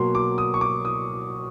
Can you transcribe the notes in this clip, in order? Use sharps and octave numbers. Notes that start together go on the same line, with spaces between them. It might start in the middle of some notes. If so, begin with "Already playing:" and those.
Already playing: B2 F#3 A#3 C6
D6
D#6
C#6
D6
D#6